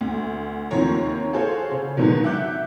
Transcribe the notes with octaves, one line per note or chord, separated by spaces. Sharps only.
D2
D#2 D#3 F3 C4 C#5 A#5
F#4 G#4 A4 C5 C#5 F5
C#3
G#2 B2 D3 D#3 F#3
E5 F#5 D6 F#6 G6